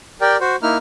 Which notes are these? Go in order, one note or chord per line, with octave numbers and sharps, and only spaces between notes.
G4 A#4 D5 G5
F#4 C5
A#3 D#4 E4 F6